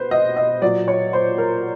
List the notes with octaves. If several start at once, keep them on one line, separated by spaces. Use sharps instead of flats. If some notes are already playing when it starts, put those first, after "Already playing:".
Already playing: B2 B4 C5
D#5
D#5
A#2 F#3 D5
C#5
C5
A#4